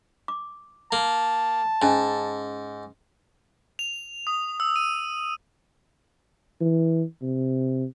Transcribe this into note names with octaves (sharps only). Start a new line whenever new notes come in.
D6
A#3 A5
G#2 C#4 D#5 G#5
F7
D#6
E6
D#7
E3
C3